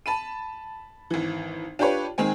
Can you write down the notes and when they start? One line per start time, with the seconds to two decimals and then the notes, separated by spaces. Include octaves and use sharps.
0.06 A5 B5 D#7
1.10 G#1 E3
1.79 D4 F4 G4 B4 C#5
2.18 D#3 G#3 C4 G#5